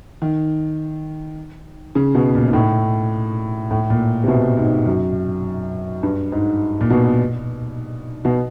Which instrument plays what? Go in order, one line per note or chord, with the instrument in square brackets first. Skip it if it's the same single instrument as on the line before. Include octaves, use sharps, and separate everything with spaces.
[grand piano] D#3
C#3
B2
A#2
G#2
A2
A2
A#2
C3
B2
G#2
F#2
G2
G#2
A#2
B2
B2